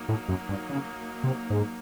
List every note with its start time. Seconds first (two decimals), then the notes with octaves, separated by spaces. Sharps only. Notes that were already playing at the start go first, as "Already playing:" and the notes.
Already playing: F#3 A#3 D#4
0.09 A2
0.28 F#2
0.49 G2
0.70 C#3
1.24 C3
1.50 G#2